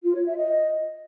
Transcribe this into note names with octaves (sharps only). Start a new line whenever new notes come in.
F4
C#5
E5
D#5